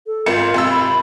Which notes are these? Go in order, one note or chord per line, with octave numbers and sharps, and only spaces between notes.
A4
G#1 F4 A#4 C#7
G#1 C3 E6
B5